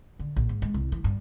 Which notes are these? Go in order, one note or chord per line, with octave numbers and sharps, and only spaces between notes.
D3
A#1
G#2
G#3
C2
E3
G2